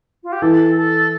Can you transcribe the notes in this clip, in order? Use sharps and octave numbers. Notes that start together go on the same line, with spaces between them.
F4
G4
E3 A4
A4